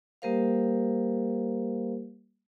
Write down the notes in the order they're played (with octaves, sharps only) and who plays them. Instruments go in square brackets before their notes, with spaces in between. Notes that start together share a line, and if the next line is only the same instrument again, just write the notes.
[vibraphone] G3 A#3 G4 A#4 C5 F5